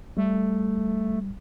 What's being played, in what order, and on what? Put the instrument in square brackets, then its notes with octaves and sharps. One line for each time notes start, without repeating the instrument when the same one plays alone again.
[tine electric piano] G3 [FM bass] A3